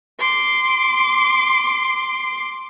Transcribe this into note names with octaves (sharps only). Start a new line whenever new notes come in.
C6 D6